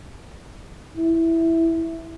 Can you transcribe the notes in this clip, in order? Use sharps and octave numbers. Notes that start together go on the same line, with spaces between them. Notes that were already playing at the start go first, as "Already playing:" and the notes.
E4